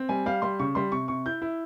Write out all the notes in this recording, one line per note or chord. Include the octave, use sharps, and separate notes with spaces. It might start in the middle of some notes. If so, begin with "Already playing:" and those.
Already playing: C4
G3 G#5
G3 F5
G3 C6
C#3 C#6
G3 C6
C3 C#6
C3 C#6
E4 G6
E4